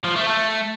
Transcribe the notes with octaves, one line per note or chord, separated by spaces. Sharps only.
F3
A3
A3